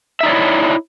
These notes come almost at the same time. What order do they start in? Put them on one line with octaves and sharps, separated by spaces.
E5 D#4 D5 C#5 E4